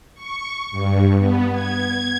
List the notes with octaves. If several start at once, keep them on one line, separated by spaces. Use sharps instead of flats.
C#6
G2
B3
G#6